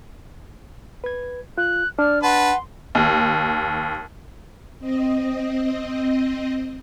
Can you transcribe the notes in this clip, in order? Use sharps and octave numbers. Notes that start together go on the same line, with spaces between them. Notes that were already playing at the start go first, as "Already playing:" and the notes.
B4 G#6
F4 F#6
D4 D5 F6
B4 F#5 A5 C6
D#2
C4 D#5